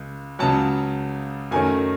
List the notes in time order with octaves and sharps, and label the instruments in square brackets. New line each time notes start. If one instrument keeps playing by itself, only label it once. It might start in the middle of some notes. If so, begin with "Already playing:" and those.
Already playing: [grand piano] C#2 G#3
C#2 C#3 F#3 A5
F#2 D#3 A3 C#4 G#5